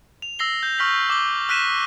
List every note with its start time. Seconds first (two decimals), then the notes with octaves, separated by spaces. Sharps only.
0.22 F7
0.39 E6 A#6 C7 G7
0.63 G6
0.78 C#6 F6 G6 B6 F#7
1.10 D6 G7
1.49 F6 F#6 B6 D#7 E7